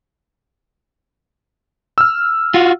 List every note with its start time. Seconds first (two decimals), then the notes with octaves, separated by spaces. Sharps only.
1.98 E6 F6
2.54 F4 F#4